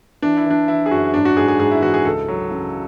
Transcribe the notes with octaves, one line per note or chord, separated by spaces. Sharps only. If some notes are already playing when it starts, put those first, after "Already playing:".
E3 D4
E4
E3 D4
E3 E4
G#4
F#2 F#4
G#2 D4
F#4
G#2 G#4
G#4
G#2 G#4
E4
E3 F#4
G#4
C#2 A4
F#3
C#3